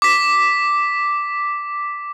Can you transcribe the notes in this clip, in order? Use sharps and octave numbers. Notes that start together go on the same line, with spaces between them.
D6 B6